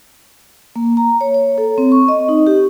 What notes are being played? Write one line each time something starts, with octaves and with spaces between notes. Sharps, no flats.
A#3
A#5
C#5
C#5
A4
C4
C#6
D#5
D#4
G4